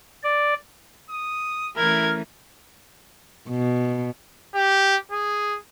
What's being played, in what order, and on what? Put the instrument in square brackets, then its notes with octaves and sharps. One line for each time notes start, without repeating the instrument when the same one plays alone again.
[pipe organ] D5
[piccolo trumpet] D#6
[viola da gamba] E3 A3 C#4 [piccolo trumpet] E4 [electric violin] A#4 G#6 [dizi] F6
[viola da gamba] B2
[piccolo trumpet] G4
G#4